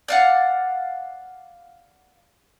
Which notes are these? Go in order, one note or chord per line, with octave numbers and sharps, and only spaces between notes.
D5 F5 F#5